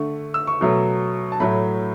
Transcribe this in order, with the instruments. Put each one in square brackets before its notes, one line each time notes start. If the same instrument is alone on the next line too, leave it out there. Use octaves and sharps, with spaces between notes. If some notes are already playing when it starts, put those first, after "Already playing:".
Already playing: [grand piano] D3 A3 C#6
E6
C#6
B2 F#3 A3
A5
A2 F#3 A3 B5